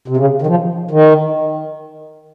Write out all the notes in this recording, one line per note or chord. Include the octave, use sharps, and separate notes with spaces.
C3
C#3
D#3
F3
D#3